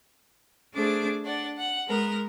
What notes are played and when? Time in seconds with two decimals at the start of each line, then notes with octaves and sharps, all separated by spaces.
0.74 A3 D4 G#4 C5 D6
1.24 D4 D5 F#5
1.57 F#5
1.87 G#3 B3 A#4